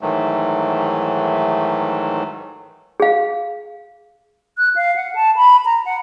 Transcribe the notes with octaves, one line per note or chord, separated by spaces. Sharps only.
G#2 D#3 E3 F#3 A3
G#4 F5
F#6
F5
F#5
A5
B5
A#5
F#5